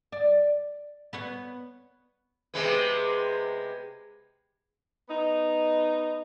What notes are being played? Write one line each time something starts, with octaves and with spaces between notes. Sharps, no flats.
D5
B3 B4 C#5
C3 G#3 B3
B3 D#4